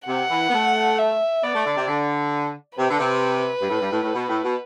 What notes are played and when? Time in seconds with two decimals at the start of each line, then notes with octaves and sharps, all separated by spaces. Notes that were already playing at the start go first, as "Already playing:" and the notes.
0.08 C3 F#5
0.30 E3
0.50 B3
0.53 A3
0.98 E5
1.43 B3 D5
1.55 A3
1.66 D3
1.77 C3
1.88 D3
2.78 C3 B4
2.90 D3
2.99 C3
3.62 G2
3.70 A2
3.81 G2
3.92 A2
4.03 A2
4.14 B2
4.29 A2
4.44 B2